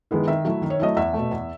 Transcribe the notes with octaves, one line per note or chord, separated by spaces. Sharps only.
D#3 G#3 B3 E4
D#3 E5
F#3 A3 E4
D#3
C#5
F#3 A3 E4 D#5
E2 E5
B2 A3
E2